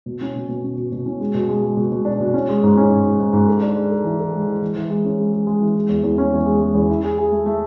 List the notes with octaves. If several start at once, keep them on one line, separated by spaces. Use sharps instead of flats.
B2
C#4
B2
B2
C#4
B2
B2
C#4
G#3
B2
G#3
G#3
B2
B2
D4
B2
C#4
G#3
G#2
C#4
G#2
G#2
G#2
G#2
A4
D4
G#3
A4
E3
A4
G#3
E3
E3
E3
G#3
C#4
G#3
G#3
G#3
E3
G#3
E2
E2
C#4
E2
G#3
G#3
E2
E4
G#4
G#4
A3
A3